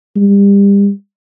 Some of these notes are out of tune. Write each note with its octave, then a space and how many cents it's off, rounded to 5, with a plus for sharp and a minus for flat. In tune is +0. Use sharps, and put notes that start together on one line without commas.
G3 +30